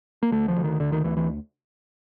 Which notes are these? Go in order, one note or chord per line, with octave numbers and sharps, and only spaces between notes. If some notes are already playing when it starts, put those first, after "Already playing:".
A#3
D2 A3
F3
D2
D#3
D2 D3
D#3
D2 E3
E3